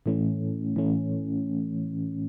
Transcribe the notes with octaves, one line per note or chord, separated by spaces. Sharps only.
A2 E3 A3 C#4
A2 E3 A3 C#4